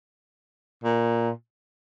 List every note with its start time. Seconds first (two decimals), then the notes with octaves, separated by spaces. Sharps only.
0.84 A#2